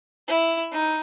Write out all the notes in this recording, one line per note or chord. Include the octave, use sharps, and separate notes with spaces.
E4
D#4